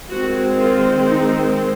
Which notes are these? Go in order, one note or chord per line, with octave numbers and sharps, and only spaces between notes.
D#3 G#3 C4 F#4
F4
D#4